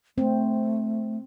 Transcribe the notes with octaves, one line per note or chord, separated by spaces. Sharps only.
A3 C4